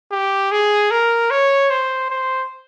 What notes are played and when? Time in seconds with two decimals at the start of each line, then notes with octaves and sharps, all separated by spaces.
0.11 G4
0.51 G#4
0.91 A#4
1.30 C#5
1.70 C5
2.10 C5